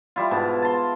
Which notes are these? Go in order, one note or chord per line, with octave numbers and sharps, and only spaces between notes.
G3 E4 F4
G#2 B2 A5
A5 C6